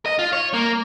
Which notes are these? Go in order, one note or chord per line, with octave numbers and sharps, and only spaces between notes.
D#5
F4
C#5
A#3